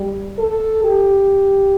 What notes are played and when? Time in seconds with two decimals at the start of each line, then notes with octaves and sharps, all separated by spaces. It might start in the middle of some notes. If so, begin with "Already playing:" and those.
Already playing: G3
0.38 A4
0.84 G4